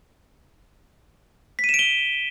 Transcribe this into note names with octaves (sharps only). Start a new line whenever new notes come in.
B6
D#7
E7
D7
G7